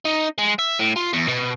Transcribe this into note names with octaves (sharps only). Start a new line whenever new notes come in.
D#4
G#3
E5
A2
F4
E2
B2